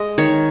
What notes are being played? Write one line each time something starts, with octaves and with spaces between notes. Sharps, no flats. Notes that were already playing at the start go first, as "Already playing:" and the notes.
Already playing: G#3 D#5
D#3 C#5